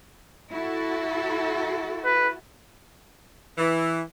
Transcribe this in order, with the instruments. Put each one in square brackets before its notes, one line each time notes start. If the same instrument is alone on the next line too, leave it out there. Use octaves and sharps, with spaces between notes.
[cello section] E4 F#4 A4
[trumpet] B4
[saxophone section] E3